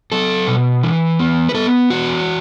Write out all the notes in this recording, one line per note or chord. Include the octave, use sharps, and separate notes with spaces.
F#3 A4
B2
E3
B3
B4
B3 A4
E3 F#4